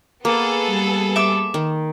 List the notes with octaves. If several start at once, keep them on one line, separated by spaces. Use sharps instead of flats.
A#3 B3 G#4 A4
G3
E5 D6
D#3